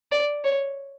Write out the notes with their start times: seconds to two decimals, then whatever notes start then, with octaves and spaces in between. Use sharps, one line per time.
0.12 D5
0.44 C#5